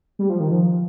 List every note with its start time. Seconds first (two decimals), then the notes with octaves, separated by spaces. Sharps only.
0.19 G3
0.30 F3
0.40 D#3
0.51 F3